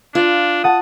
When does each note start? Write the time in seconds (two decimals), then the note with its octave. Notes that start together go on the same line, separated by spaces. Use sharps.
0.15 D4 F4
0.64 F#5 A5 D#6